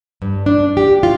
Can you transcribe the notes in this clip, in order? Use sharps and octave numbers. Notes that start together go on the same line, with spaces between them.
G2
D4
G4
F4